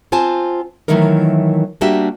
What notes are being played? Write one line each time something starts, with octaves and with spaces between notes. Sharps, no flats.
C4 F4 C5 G#5 A5
D#3 E3 F#3 A3 D#4 A#4
G3 A#3 D4 F#4 G4 E5